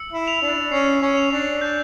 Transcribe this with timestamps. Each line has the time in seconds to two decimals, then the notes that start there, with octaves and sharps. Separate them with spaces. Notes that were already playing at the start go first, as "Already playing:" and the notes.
Already playing: E6 C#7
0.13 E4
0.28 F7
0.42 D4
0.72 C#4 C7
1.02 C#4
1.17 F7
1.32 D4
1.61 D4 G6